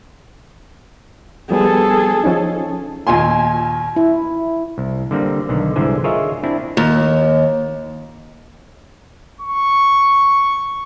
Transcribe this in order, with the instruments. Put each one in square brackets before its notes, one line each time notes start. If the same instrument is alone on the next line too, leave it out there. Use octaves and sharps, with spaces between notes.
[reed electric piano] F3 G3 B3 [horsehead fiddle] G#4 A4
[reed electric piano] F3 C#4 D#4
[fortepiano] D#2 A#2 G#5 C6
[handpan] E4
[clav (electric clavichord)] C2
D3 G3 A#3 C4
B1 D3 D#3
C2 G#2 D3 E3 C5 G#5
F4 G#4 A#4 C#5 D#5 E5
C4 D4 E4
[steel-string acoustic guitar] D#2
[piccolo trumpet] C#6